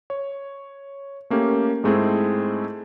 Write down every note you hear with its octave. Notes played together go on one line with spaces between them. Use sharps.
C#5
A3 A#3 C#4 G4
G#2 G#3 A3 C4 E4 G#4